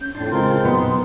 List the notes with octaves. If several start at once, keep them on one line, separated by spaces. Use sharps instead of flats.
C#4 G6
F2 A2 D4 A5 C6
C#3 G#3 C4 F4 A#4 A5 C6
F#2 A#2 F#3 B3 D#4
B2